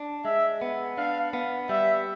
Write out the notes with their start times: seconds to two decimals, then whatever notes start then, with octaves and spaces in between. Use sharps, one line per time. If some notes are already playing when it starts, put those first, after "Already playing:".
Already playing: D4
0.25 G#3 E5
0.62 B3
0.97 D4 F5
1.33 B3
1.69 G3 E5